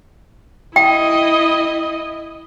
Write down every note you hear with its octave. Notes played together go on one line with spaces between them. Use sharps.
E4 D#5 G5